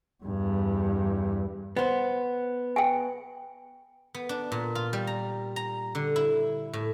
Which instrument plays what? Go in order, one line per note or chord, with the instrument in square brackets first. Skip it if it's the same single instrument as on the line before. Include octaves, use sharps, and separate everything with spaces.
[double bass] E2 G2
[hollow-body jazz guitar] B3 C5
[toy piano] G5 G#5
[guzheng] B3
D4
A#2
F4
G3
A#5
A#5
D3
E4
A2